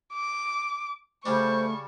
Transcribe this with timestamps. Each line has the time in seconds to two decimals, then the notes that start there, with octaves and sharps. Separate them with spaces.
0.14 D6
1.26 C#3 G3 A3 D4 C5 C#6